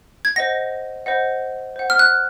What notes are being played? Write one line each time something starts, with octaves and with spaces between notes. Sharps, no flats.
G#6
C5 D#5 F#5 A#6
C5 D#5 F#5
C5 F#5
F6
F#6